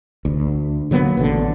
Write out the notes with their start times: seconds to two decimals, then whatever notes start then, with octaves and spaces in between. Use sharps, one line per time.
0.25 D2
0.91 D3 F#3 A#3 B3
1.17 A1 B2 D3